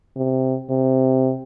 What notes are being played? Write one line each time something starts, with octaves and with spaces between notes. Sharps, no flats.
C3
C3